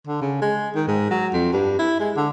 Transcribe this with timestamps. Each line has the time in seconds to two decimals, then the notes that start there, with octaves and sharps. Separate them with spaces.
0.07 D3
0.22 C#3
0.42 G#3
0.75 D#3
0.88 G#2
1.11 F#3
1.33 F2
1.52 G2
1.79 E4
2.00 G#3
2.17 D3